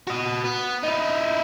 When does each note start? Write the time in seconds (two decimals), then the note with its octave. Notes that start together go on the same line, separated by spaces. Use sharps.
0.08 F#4 D#5
0.45 B3
0.83 D#4 E4